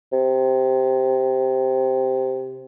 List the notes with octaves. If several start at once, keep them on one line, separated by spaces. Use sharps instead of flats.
C3